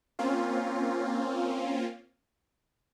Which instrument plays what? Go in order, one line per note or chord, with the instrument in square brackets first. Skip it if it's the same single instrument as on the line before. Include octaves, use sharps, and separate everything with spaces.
[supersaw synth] A#3 C4 C#4 F4